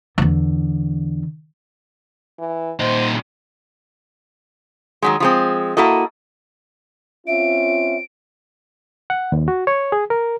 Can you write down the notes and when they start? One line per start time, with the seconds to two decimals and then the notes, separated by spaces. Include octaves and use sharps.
0.18 E2 D3
2.39 E3
2.80 A#2 D#4 C5
5.02 D#3 F#3 G#3
5.20 F3 G#3 C4
5.77 A#3 E4 F#4 A4 D#5
7.27 C4 C#4 F4 E5 D7
9.10 F#5
9.32 D#2
9.48 F#4
9.67 C#5
9.92 G#4
10.10 A#4